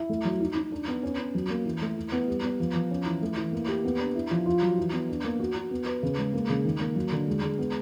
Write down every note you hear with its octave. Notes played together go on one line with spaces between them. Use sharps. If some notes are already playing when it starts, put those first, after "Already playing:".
Already playing: E4
A3
F#3
D#4
D#4
D4
B3
C#4
C#4
F#3
A#3
E3
A3
E4
B3
G3
B3
F3
F3
C#4
E3
A3
E3
A#3
G4
B3
D4
E4
F3
F4
F#3
E3
B3
D4
A#3
F#4
F#4
B3
B4
C#3
G#3
A#3
C#3
D#3
A#3
F#3
D3
G#3
G#3
B3